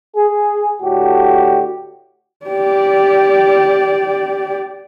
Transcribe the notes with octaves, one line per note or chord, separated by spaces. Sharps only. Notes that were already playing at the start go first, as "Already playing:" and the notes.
G#4
A2 D3 F#4 G4
G4 D5